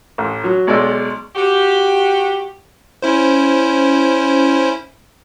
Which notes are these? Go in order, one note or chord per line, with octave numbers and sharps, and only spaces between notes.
A1
F#3
B1 G#3 D5 E6
F#4 G4
C#4 E4 C5